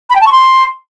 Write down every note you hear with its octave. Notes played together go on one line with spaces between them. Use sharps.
B5
G5
A5
C#6
C6